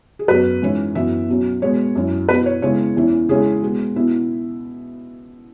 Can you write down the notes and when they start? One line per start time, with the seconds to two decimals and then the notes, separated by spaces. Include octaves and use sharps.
0.19 G#4
0.28 F#2 F#3 B3 B4
0.62 G#2 E3 C#4 E4
0.95 F#2 E3 B3 E5
1.28 B2 F#3 C#4
1.62 B2 G#3 B3 C#5
1.95 F#2 F#3 C#4 E4
2.29 B2 B3 E4 B4
2.46 C#5
2.62 C#3 G#3 B3 E4 C#5
2.96 E2 E3 C#4 E4
3.29 C#3 G#3 C#4 E4 G#4
3.62 B2 G#3 B3
3.96 B2 B3 E4